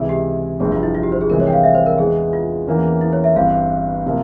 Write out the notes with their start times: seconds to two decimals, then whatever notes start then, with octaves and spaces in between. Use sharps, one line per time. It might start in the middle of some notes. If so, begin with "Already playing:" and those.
Already playing: C#2 C3 E3 G#3 E4
0.09 G4
0.60 G1 F2 C3 G3 C4 G#4
0.72 F4
0.83 E4
0.95 F4
1.03 G4
1.12 C5
1.21 G#4
1.29 C2 C3 E3 G#3 A#4
1.40 C#5
1.47 G5
1.53 F5
1.64 E5
1.75 C5
1.86 A#4
1.98 E2 E3 G#3 G#4
2.33 F4
2.66 E2 E3 A#3 C#4
3.01 E4
3.13 C#5
3.24 E5
3.36 G1 G2 E3 G3 C4 F5
4.06 C3 F3 A#3